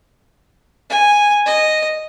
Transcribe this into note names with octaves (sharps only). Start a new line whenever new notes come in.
G#5
D#5